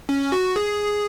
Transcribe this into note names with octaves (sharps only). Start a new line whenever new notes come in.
C#4
F#4
G#4